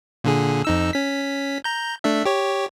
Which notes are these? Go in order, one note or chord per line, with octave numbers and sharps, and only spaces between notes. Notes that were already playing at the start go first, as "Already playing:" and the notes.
A#2 D3 G#4
F2 D#4 E6
C#4 B6
A#5 G6
A3 D4 E5
G4 C#5